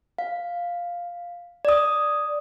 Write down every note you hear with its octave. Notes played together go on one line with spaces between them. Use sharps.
F5
D5 D#6